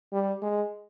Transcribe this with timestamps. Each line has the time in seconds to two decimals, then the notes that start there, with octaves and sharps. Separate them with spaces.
0.13 G3
0.42 G#3